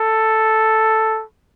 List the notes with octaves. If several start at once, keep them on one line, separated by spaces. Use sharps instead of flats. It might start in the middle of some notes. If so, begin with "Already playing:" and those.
Already playing: A4